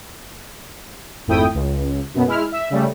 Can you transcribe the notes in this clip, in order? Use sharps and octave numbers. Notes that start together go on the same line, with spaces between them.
G#1 F2 A3 E4 G5 D#6
C#2
F#2 B2 B3
G#3 E4 F6
E5
C#3 G3 A3